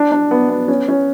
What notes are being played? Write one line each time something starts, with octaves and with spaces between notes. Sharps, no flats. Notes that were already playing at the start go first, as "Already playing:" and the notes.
Already playing: D4
D4
B3
B3
C#4
C#4